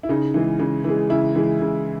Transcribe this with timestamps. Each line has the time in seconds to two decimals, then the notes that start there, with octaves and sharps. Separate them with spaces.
0.03 E4
0.09 C#3 D#4
0.34 E3 G#3
0.59 C#3
0.84 E3 G#3
1.09 C#3 E4
1.35 E3 G#3
1.61 C#3